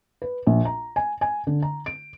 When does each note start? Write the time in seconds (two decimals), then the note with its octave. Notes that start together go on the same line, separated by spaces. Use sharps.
0.22 B4
0.46 A#1
0.65 A#5
0.96 G#5
1.21 G#5
1.47 D3
1.63 A#5
1.86 D7